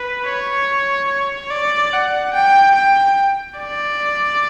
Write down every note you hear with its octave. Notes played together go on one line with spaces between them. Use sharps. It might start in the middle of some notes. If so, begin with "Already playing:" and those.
Already playing: B4
C#5
C#5
D5
F#5
G5
G5
D5